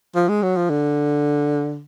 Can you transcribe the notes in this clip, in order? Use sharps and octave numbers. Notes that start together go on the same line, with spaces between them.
F3
G#3
F#3
F3
D3